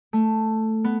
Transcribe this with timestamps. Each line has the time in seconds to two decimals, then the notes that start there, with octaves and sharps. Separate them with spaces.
0.13 A3
0.84 B3